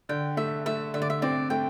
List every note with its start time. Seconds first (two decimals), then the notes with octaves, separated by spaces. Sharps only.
0.09 D3 G5
0.37 A3 E5
0.66 A3 E5
0.94 D3 E5
1.02 D5
1.10 E5
1.22 C4 D5
1.50 A3 G5